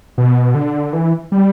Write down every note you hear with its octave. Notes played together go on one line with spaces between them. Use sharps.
B2
D3
E3
G3